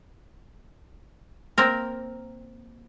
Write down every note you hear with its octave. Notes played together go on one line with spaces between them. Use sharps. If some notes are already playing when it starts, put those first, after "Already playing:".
A#3 C4 A#4